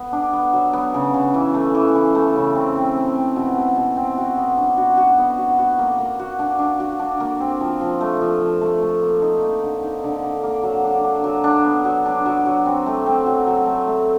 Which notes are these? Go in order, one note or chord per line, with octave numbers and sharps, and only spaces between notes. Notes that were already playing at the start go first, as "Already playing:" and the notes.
Already playing: B3
D4
B3
F#3
B3
C#3
C#3
E3
A3
E3
E3
A3
C#3
C4
C4
C4
C4
B2
B2
B2
C4
F#4
B3
D4
F#4
F#4
B3
F#4
F#4
A#3
A#3
F#4
D4
D4
F#4
D4
A#3
C4
F3
F3
A3
F3
F3
A3
A3
A#3
D#4
A#3
D3
D#4
D3
D3
A#3
F#3
D4
D4
F#3
D4
B3
F#3
D4
F#3
F#3
C4
A3
C4
F#3
F#3
A3
A3